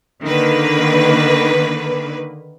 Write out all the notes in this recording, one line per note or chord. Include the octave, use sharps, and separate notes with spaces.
D3 D#3 A#3 B4